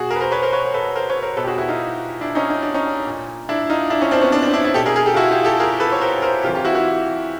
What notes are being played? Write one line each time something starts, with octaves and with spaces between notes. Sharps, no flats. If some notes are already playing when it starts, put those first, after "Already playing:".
Already playing: B2 F#4 G#4
G#4 A#4
B4
A#4 C5
B4 C#5
A#4 C5
B4 C#5
A4 B4
A#4 C5
B4 C#5
A#4 C5
B2 A4 B4
G4
F#4 G#4
E4 F#4
D#4 F4
D4 E4
C#4 D#4
D#4
D4
C#4 D#4
A#2
D4 E4
D#4 F4
D4 E4
C#4 D#4
C4 D4
B3 C#4
C4 D4
C4 D4
D4 E4
D4 E4
B2 G4 A4
G#4 A#4
G#4 A#4
G4 A4
F4
E4 F#4
F4 G4
G4 A4
G#4 A#4
A4 B4
C#5
A#4 C5
A#4 C5
C3 E3 F4 G4
F4 G4
E4 F#4
E4 F#4